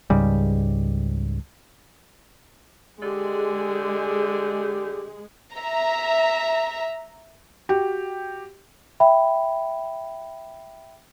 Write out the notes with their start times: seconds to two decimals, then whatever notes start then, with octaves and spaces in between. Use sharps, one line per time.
0.10 C#2 G#2 C#3 G3
3.02 D3 G#3 G4 G#4
5.54 E5 A#5
7.69 F#4 G4
9.00 E5 G5 B5